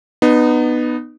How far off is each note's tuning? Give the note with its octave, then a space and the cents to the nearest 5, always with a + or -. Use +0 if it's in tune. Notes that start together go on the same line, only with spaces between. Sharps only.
B3 +0 D#4 -30